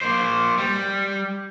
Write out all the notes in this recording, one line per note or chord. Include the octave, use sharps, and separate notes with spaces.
A#3 C5
G3